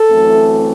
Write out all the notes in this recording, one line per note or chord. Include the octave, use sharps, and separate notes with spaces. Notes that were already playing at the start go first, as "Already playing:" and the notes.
Already playing: A4
F#2 E3 A3 C4